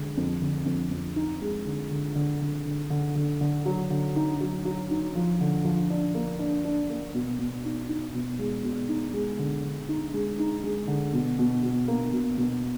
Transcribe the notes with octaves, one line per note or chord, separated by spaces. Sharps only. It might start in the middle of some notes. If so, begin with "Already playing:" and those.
Already playing: D3 G#3
F2
D3
F2
F2
D#4
G#3
D3
D3
D3
D3
D3
D3
D3
D3
F#3
D3
D#4
F#3
F#3
D#4
F3
D3
F3
D4
A#3
D4
D4
A#3
B2
B2
D#4
D#4
B2
G#3
B2
D#4
G#3
D3
D3
D#4
G#3
D#4
G#3
D3
B2
B2
B2
A#3
B2
B2